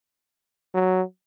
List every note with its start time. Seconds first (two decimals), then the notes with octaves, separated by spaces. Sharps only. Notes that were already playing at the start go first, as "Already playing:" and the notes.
0.74 F#3